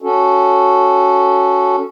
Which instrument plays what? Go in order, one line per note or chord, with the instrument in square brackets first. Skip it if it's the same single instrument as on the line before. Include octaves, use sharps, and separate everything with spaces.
[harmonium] C#4 F#4 A4